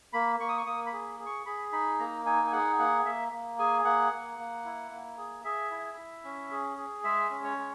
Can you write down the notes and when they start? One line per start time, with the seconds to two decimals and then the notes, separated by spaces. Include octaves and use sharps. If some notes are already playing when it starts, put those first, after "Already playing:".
0.13 A#3 B5
0.40 A#3 C#6
0.49 D#6
0.57 C#6
0.66 A#3 D#6
0.86 B5
0.93 G#4
1.19 G#4
1.26 C#6
1.46 G#4 B5
1.72 D#4 B5
1.99 A#3 A#5
2.26 D#4 G#5
2.47 G#5
2.53 G#4 F#5
2.79 A#3 F#5
3.05 A#3 E5
3.33 A#3
3.59 G#4 G#5
3.85 A#3 F#5
4.12 A#3
4.39 A#3
4.65 E4
4.91 A#3
5.18 G#4
5.44 G#4 E5
5.71 E4
5.98 E4
6.25 C#4
6.51 G#4
6.77 G#4
7.04 G#3 E5
7.30 C#4
7.44 C#5
7.58 G#3